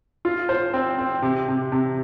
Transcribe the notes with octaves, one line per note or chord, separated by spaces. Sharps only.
F4
C5
C4
C4
C3
C3
C3